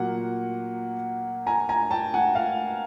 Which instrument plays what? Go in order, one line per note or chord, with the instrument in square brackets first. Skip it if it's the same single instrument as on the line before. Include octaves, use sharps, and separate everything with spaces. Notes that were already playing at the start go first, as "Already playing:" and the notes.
Already playing: [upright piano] A#2 F#3 A#3 F#5
G#5 A#5
G#5 A#5
G5 A5
F#5 G#5
F5